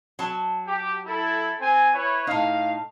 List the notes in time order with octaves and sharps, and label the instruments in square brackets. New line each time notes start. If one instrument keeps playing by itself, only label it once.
[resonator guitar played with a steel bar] F#3 A5
[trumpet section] G4
E4 A4
C4 G#5
E4 B4 C#5
[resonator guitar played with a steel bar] A2 D#4 [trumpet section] F5